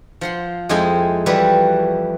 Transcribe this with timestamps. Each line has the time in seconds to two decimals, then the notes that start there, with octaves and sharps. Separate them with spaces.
0.21 F3 F#5 C6
0.69 F2 G#3 E4 D#5 G5 G#5
1.26 F2 E3 G3 E4 F#4 B4